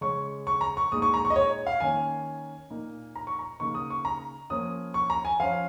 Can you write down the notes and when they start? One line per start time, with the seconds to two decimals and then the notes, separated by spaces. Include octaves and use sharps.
0.01 C#3 G#3 C#4 C#6
0.47 C#6
0.61 A#5
0.77 C#6
0.92 A#2 G#3 D#4 D#6
1.02 C#6
1.14 A#5
1.25 C#6
1.30 D#5
1.36 C#5
1.67 F5
1.80 D#3 A#3 C#4 G#5
2.70 A#2 A#3 D#4
3.16 A#5
3.27 C#6
3.39 A#5
3.60 C#3 A#3 D#4 C#6
3.75 D#6
3.90 C#6
4.05 A#5
4.50 F3 A#3 C#4 D#6
4.94 C#6
5.10 A#5
5.25 G#5
5.40 F3 C#4 F5